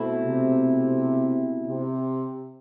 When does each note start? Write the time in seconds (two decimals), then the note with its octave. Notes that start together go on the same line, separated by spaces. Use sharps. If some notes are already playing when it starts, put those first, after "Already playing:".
Already playing: B2 A3 C4 E4
0.25 C3
1.67 C3